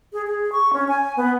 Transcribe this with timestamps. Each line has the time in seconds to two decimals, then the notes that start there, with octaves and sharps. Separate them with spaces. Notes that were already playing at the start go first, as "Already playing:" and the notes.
0.13 G#4
0.27 G#4
0.52 C#6
0.73 C#4
0.88 G#5
1.17 B3